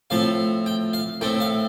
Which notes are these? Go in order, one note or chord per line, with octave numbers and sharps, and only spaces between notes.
A2 F3 C4 F5
G5
F5
A2 A3 C4 G5
F5